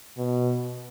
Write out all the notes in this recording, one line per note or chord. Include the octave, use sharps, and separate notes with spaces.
B2